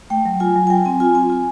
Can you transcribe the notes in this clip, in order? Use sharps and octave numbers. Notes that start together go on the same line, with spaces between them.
A3 G5
F#3
F4 G#5
F#3
G#5
F#3 G5
C4 G#5
F4 G#5
C4 G#5
F4